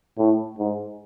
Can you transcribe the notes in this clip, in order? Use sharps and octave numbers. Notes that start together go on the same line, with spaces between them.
A2
G#2